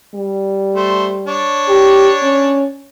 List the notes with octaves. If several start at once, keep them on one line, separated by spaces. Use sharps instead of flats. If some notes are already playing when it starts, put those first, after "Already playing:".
G3
A3 C5
D4 C#5
G4
C#4